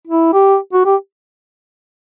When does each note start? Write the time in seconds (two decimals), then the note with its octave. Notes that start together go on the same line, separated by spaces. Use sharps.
0.07 E4
0.33 G4
0.73 F#4
0.85 G4